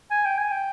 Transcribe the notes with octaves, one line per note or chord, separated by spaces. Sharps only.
G#5
G5
G#5
G5